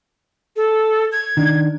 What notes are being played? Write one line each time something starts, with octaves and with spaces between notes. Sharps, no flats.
A4
G#6
D#3 D4